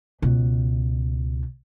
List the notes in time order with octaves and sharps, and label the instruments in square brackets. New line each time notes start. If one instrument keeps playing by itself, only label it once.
[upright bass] C#2 B2